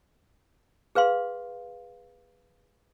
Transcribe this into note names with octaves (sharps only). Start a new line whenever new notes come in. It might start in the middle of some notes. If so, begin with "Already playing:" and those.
G#4 B4 F5 C6